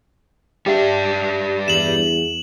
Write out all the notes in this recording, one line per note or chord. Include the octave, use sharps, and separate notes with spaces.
G3 D4 G4 E5
E2 E7 F#7